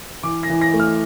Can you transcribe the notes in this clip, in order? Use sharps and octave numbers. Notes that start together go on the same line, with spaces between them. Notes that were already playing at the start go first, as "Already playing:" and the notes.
E3 D6
A#6
E3
A#6
A3
F6